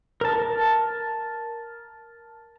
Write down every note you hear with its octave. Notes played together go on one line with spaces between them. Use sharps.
A#4 A5